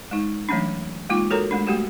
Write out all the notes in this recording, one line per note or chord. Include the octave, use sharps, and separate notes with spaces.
G#3 D#4
E3 F#3 A3 C#4 D4
G#3 A#3 D#4 F4 D6
F#4 A4 A#4 C#5 A#5
G#3 A3 D4
G3 A3 A#3 F#4 G4